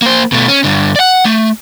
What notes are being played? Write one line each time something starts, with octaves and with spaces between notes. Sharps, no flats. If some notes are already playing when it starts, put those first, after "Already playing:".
A#3 C5
B2 A3
C#4
G2 D3
D5 F#5
A3